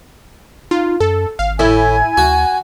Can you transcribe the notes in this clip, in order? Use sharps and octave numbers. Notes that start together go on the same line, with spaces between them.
D#4 F4
F#2 A4
G#1 F5
A2 E4 G#5
D2 F#4